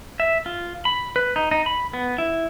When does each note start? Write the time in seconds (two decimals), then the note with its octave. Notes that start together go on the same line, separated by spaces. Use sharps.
0.20 E5
0.46 F4
0.85 B5
1.16 B4
1.36 D#4
1.51 D#4
1.66 B5
1.94 B3
2.18 E4